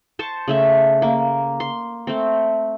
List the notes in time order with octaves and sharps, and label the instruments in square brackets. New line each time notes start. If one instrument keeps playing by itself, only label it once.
[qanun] C5 A5 C#6
C#3 A3 E5
A#3
C6
A3 C4